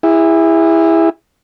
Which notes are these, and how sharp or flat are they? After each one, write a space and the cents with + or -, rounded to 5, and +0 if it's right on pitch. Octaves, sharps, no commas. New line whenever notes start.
E4 +0 G#4 -35